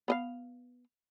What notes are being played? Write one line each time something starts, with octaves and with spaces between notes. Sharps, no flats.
B3 D#5 F5